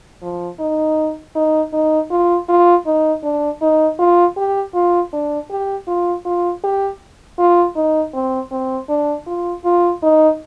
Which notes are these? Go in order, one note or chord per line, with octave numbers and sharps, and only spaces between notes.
F3
D#4
D#4
D#4
F4
F4
D#4
D4
D#4
F4
G4
F4
D4
G4
F4
F4
G4
F4
D#4
C4
C4
D4
F4
F4
D#4